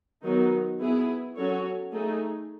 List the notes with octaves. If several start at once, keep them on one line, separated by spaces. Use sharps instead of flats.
D#3 F#3 B3 D#4
B3 E4 G#4
F#3 C#4 F#4 A4 C#5
A3 D#4 G#4